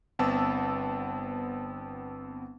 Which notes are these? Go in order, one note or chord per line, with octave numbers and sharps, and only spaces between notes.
G1 B3 C4 A5 E6